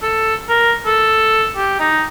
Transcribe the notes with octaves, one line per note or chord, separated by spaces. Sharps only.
A4
A#4
A4
G4
D#4